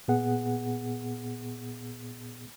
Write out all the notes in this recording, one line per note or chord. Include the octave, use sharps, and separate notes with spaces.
A#2 B3 G#4 F#5